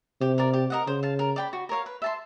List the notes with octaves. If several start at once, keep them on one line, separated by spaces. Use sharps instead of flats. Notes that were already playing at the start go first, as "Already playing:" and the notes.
C3 G4
A#4 D5
G4
A#4 D#5 F#5
C#3 C5
F5 A5
A#4
D5 G5 B5
F#4
A#4 C#5 F5
B4
E5 A5 C6